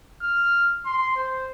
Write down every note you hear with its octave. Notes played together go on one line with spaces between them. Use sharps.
F6
C6
C5